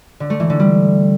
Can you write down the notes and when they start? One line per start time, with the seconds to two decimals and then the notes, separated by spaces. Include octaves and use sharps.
0.20 D3
0.30 A3
0.40 E3
0.50 D3
0.59 G3